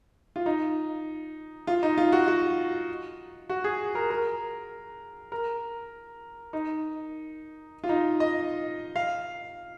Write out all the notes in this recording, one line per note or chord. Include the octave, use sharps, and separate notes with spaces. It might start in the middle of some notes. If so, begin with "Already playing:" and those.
F4
D#4
F4
D#4
F4
F#4
F#4
F#4
G#4
A#4
A#4
A#4
D#4
F4
D#4
D#5
F5